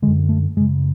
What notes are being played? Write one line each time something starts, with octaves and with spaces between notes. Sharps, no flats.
F#2 D3 G#3
A3
F#2 C#3 G#3